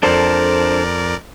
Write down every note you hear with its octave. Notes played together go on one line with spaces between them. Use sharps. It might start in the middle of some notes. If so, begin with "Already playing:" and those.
F2 D4 A4 A#4 C5 D5